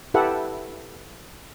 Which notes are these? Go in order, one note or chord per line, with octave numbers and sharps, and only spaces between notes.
E4 G4 A4 B4 E5 F#5